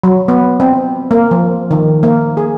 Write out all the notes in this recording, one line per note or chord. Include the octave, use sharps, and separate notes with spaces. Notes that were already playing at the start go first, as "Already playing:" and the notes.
F#3
B3
C4
A#3
F3
D#3
A#3
G#4